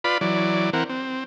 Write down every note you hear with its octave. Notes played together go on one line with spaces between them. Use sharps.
F4 B4 D5 B5
E3 F#3 D5
E3 C4 A#4 F#5
C4